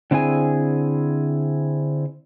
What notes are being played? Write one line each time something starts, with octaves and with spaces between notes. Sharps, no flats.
D3 C4 E4 G#4 G#5